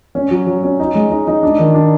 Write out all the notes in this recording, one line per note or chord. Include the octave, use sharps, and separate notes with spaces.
C#4
F#3
F#3
C#4
D#4
G#3
D#4
D#4
D4
D#3
D4